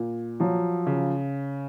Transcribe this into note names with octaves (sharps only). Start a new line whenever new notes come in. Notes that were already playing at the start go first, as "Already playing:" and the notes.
Already playing: A#2
F3 F#3
C#3